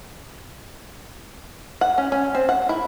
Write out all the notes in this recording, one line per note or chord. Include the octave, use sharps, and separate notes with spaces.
F#5
C#4
C#4
C4
F#5
E4